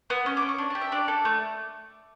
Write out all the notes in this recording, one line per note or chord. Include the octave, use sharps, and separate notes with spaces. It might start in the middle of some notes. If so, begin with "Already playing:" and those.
B3
C#4
D6
C#4
C#6
D4
G4 A5
E5
D4 D5
A4
A3